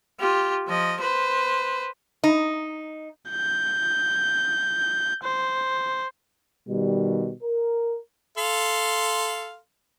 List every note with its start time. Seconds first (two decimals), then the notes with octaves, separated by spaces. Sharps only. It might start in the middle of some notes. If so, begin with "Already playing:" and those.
0.20 F4 G4
0.68 F3 D#5
1.00 B4 C5
2.24 D#4
3.30 G6
5.24 C5
6.69 B2 D#3 G3
7.43 A#4
8.38 A4 F5 C6